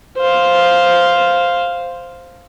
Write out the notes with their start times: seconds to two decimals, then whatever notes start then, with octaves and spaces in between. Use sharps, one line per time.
0.18 C5 F5